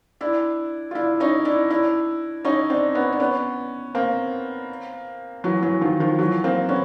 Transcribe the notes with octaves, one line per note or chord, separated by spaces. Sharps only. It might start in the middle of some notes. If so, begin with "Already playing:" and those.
D4 E4
F4
D4 E4
C#4 D#4
D4 E4
D4 E4
C#4 D#4
C4 D4
B3 C#4
D4
B3 C#4
A#3 C4
E3 F#3
E3 F#3
D#3 F3
D#3 F3
E3 F#3
A#3 C4
B3 C#4